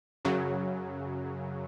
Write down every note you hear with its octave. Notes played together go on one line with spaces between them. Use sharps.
F#2 C#3 F#3